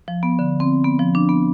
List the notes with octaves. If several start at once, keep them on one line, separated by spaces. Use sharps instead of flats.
F3
B3
D3
C4
B3
F3
D4
B3